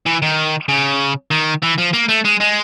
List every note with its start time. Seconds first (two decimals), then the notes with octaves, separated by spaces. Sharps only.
0.06 E3
0.22 D#3
0.69 C#3
1.31 D#3
1.62 E3
1.78 F3
1.93 A#3
2.08 A3
2.25 G#3
2.40 G#3